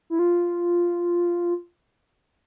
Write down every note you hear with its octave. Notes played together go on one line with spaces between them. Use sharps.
E4
F4